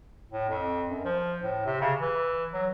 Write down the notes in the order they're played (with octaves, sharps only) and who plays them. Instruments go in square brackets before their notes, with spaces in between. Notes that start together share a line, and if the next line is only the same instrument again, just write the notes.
[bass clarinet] A2
F2
F#2
F3
A2
C3
C#3
E3
F#3